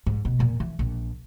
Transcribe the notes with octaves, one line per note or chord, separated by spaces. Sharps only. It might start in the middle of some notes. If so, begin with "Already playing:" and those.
G#2
B2
E2 A#2
E3
A#1